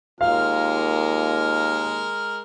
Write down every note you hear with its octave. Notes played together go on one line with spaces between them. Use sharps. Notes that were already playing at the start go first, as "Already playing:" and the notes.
D#2 G#3 F4 A#4 F5 F6